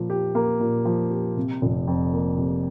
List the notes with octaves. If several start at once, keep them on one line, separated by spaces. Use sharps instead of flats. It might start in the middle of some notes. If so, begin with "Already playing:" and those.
Already playing: A#2 F3 A#3
G4
A#3
A#2
F3
G4
C3
F1
F2
A#3
C3